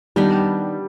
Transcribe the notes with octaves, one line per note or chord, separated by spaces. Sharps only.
D#3 G3 B3 D4 G4